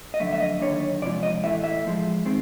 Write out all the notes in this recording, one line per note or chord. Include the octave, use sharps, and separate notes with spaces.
D#5
F2 D3 F#3 A3 E5
E5
D#5
D#2 D3 F#3 D4 C#5
C3 F3 G#3 C#4 F4 D5
D#5
A2 E3 A3 E5
E5
A2 F3 G#3
D#3 G#3 C4